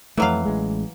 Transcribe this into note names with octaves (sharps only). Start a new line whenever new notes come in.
F2 E3 F#3 A3 F5
A1 G#3